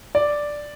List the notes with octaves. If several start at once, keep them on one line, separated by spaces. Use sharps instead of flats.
D5